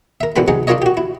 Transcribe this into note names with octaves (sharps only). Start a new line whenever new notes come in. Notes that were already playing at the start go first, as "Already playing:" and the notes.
A#4 E5
A1 G#2 B2 D3 G5 B5
C3 F#3 D#4 G#4
D4 D#4 F4 A#4 C#5 D#5
F#4 G4
E4